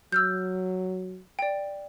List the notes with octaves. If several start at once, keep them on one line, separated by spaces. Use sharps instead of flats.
F#3 E6 F6 G6
D5 G5